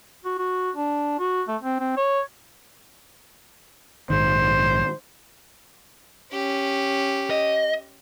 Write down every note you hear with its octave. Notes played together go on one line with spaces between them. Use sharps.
F#4
F#4
D4
F#4
A3
C4
C4
C#5
A#1 G#2 D#3 C5
C#4 G4
D#5